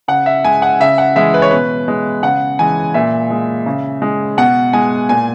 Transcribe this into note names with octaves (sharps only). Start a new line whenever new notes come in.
C#3 F#5
E5
G#3 G#5
F#5
C#3 E5
F#5
E3 G#3 E5
B4
C#5
B2 B4
G#3
C#3 F#5
E3 G#3 G#5
A#2 E5
G#3
C#3
G#3
B2 F#5
G#3 G#5
A#2 G#5